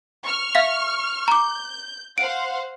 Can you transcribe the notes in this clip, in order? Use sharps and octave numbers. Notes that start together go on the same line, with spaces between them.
C#6 F6
E5 F5 B6
A#5 D6 G6
C5 F5 F#5 D7